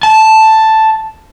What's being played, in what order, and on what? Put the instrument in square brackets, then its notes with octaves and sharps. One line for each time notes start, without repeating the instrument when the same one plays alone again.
[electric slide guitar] A5